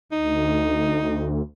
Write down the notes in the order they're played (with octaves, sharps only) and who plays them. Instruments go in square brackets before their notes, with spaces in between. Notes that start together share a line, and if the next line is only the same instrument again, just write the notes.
[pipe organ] D2 [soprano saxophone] D#4